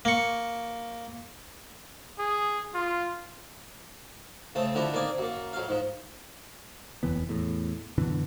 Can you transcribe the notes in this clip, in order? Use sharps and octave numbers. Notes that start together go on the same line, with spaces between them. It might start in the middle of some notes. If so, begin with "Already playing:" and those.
A#3 C#6
G#4
F4
C#3 A3 C4
D3 F3 D4 E4 F#4
D#3 A#3 C4 D5 G#5
F#2 A#3
F2 F#3 F5
G#2 F3
F1 D#2 E3 B3
E2 A2
F#2 B2 D3 E3